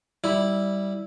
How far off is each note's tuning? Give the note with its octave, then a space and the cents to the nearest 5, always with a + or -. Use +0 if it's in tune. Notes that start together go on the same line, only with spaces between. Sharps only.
G3 -5 E4 -10